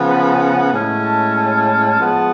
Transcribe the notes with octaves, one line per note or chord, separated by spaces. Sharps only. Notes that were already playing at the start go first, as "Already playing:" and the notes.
Already playing: C#3 F3 B3
B4
F#5
A2 G#3 C#4
A5
A5
F3 G#3 B3